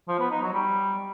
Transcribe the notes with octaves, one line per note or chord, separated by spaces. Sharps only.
F3
B3
D#4
F#3
G3